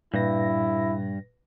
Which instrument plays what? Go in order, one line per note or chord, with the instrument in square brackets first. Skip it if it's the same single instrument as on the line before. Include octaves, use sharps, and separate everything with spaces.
[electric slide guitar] G2 [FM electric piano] A#2 B4 A#6 [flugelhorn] E4